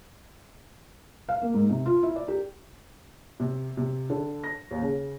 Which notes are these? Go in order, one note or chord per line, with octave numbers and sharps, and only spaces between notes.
F5
A#3
G#2
C3
F4
E4
D5
G4
C3
C3
D3
A#6
D#2
C#3